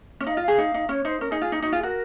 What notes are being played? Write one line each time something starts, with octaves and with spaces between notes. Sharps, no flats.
C#4
D#4 F5
D#5
F4
F5
G#4
D#4
D#4
C#4 C#5
D#4 C5
C#4 A#4
D#4 G#4
F4 G#4
D#4
D#4 F#4
F4 G#4
F#4 A#4